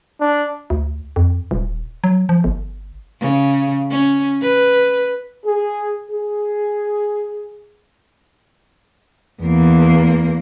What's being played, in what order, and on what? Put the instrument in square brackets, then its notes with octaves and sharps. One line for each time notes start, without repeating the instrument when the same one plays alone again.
[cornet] D4
[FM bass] D2
F2
D#1
F#3
F3
G1
[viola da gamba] C#3
C#4
B4
[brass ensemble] G#4
G#4
[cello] E2 A#3